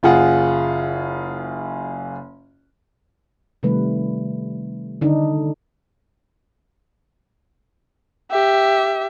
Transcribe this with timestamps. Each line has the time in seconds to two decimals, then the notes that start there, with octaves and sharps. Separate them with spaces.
0.03 F#1 F4 G#4 F#5
3.63 C3 D#3 G3 A3 B4
5.01 D3 D#3 D4 D#4
8.31 G4 E5